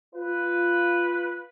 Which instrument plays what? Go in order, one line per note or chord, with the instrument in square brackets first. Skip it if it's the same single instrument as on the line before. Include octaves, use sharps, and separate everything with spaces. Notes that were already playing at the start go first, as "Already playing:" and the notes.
[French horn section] F4 [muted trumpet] B4